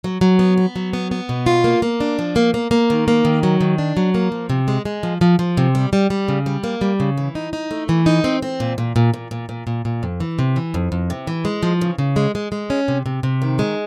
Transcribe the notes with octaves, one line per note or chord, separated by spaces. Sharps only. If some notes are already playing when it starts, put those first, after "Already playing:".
F#3
F#3
B3
B3
F#3
B3
B3
B2
F4
A#3
A#3
D4
F3
A#3
A#3
A#3
D#3
A#3
D#3
F#3
D#3
D4
F#3
A#3
F3
C3
G#3
G#3
F3
F3
F3
C3
G3
G3
G3
C#3
G3
A#3
G3
C#3
E3
D#4
D#4
A3
E3
D#4
C4
C4
A#2
A#2
A#2
A#2
A#2
A#2
A#2
A#2
F2
E3
C3
E3
F2
F2
C3
E3
G#3
F3
C#3
C#3
G#3
G#3
G#3
C#4
C3
C3
C3
D#3
G#3